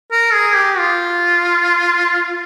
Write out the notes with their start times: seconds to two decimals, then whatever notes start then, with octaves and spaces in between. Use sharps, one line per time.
0.12 A#4
0.33 G#4
0.56 G4
0.78 F4